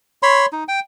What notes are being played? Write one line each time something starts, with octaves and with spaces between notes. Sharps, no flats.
C#5 B5 C6
D#4
G5